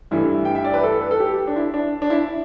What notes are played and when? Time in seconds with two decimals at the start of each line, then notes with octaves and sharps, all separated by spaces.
0.11 G2 E3 A3 E4
0.45 G5
0.55 E5
0.64 D5
0.74 B4
0.83 A4
1.02 B4
1.11 A4
1.20 G4
1.47 D4
1.56 E4
1.74 D4
2.02 D4
2.10 E4